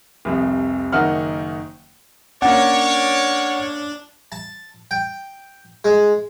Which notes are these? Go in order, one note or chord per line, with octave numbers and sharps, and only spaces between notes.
F1 C2 F2
F#1 D#3 D#4 E5 F#5 F6
A#3 C#4 D4 C#5 D5 F#5
A5
G5
G#3